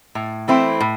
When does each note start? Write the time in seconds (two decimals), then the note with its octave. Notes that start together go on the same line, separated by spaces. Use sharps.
0.15 A2
0.48 E3 A3 C4 E4
0.80 A2